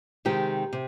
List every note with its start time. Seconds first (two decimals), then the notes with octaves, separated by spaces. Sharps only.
0.25 C3 D#3 G#3 G4
0.73 C3